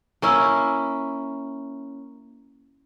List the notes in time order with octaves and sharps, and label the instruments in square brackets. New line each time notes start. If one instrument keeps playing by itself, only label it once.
[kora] A#3 C#4 E4